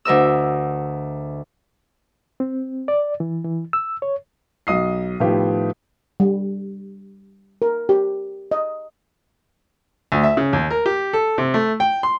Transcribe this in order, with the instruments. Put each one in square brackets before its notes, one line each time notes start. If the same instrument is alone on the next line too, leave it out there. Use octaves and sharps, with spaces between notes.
[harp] D2 A#4 D#5 E6
[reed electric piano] C4
D5
E3
E3
E6
C#5
[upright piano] B1 D#5 D#6 C7
A2 D#3 F3 B3 E4 G4
[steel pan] G3
A#4
G4
D#5
[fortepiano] D2
E5
C#3
D#2
A#4
G4
A4
C3
A3
G5
C6